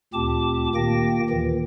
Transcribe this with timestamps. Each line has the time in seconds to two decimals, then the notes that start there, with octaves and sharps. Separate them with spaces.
0.14 D2 A#2 C4 G4 A5 D6
0.75 A#2 D#3 A#3 G4 G5 A#6
1.30 D#2 A#2 D#3 E3